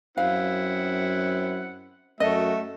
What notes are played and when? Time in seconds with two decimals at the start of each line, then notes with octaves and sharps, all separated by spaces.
0.17 F#2 C4 E4 F5 F#5
2.20 F#2 A3 F#4 D#5 E5